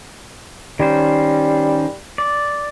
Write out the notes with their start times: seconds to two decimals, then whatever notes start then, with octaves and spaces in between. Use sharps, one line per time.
0.80 D#3 G3 C#4 C5
2.18 D5